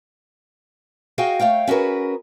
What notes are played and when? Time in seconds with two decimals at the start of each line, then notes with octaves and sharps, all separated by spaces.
1.18 F#4 G#4 D#5 F5 G5 G#5
1.40 A3 C#5 F5 G5
1.67 C#4 F#4 G#4 A#4 B4